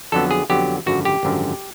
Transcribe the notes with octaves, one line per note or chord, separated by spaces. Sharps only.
F2 D3 F#3 B3 A4
G#4
F2 D3 F#3 B3 G4
G#1 F#2 D3 F3 F#4
G4
G#1 F#2 D3 F3